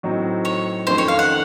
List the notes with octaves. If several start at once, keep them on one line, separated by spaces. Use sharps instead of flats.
A2 F#3 C4 D#4 F#4
C#5
F2 D#3 A3 C#4 C5
C#5
F5
F#5